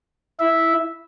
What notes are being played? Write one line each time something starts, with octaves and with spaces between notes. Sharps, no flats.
E4 E5